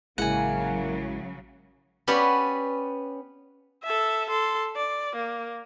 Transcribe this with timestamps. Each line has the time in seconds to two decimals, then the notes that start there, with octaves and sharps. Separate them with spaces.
0.18 A1 C#3 F#3 G#3 A#3 E4 F#5 G#5
2.07 B3 C#4 G4 D5 F#5 B5
3.83 A4 E5
4.30 A4 C6
4.76 D5
5.16 A#3